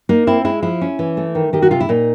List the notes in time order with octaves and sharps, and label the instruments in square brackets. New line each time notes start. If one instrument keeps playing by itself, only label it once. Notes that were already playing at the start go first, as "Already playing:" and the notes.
[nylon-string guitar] A#3 D#4
C4 E4
G#3 E4
F3 E4
C#4
E3
A3
D#3
D#3 G4
F#4
C3 F4
E4
A#2 D#4